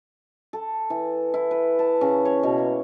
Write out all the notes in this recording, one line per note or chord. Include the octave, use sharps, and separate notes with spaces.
A4
E3
E4
B4
A5
C#3
C#5
B2
A#3